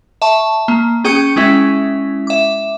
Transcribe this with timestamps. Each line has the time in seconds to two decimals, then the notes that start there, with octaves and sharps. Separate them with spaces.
0.22 E5 A5 C#6
0.68 A#3
1.04 C#4 G#4 G5 D#6 G6 C#7
1.36 G#3 C#4 E4 E5
2.27 E5 D6